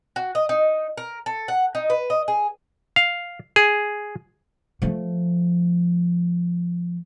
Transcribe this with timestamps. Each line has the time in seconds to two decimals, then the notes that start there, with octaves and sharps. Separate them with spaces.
0.16 F#4
0.35 D#5
0.49 D#4
0.97 A#4
1.26 A4
1.48 F#5
1.75 D#4
1.90 B4
2.10 D#5
2.28 G#4
2.96 F5
3.56 G#4
4.82 F3 A3